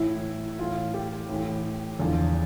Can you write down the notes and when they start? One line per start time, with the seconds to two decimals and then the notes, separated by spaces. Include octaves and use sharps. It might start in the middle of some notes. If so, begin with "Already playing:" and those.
Already playing: A2 E3 E4
0.58 A2 E3 F4
0.94 G4
1.29 A2 E3
2.00 E2 D3 F3